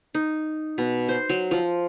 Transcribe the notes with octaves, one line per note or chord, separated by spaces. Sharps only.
D#4
B2
C5
F#3
F3